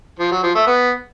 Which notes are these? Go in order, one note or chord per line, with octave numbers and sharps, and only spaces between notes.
F3
F#3
F3
A3
B3